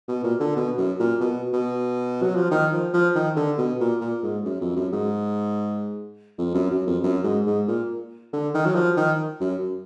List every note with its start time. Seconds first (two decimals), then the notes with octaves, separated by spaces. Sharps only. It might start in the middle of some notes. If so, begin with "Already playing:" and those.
0.08 B2
0.23 A#2
0.40 D3
0.56 B2
0.77 F#2
1.00 A#2
1.20 B2
1.53 B2
2.22 F#3
2.36 F3
2.51 D#3
2.72 F3
2.93 F3
3.15 D#3
3.36 D3
3.58 B2
3.80 A#2
4.01 A#2
4.23 G#2
4.45 F#2
4.61 F2
4.76 F#2
4.92 G#2
6.38 F2
6.54 F#2
6.71 F#2
6.86 F2
7.03 F#2
7.24 G#2
7.46 G#2
7.68 A#2
8.33 D3
8.54 D#3
8.65 F#3
8.75 F3
8.97 D#3
9.40 F#2